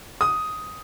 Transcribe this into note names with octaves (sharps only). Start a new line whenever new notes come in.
D#6